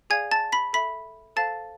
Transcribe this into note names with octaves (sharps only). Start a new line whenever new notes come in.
G#4 D5 F5 G#5 G#6
A5 A6
B5 B6
A4 E5 B5 B6
A4 C5 F5 A5 A6